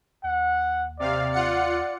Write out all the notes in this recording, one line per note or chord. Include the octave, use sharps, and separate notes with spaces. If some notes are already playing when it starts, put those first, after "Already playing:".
D#2 F#5
C3 D5 F5
F4 F#5 C#7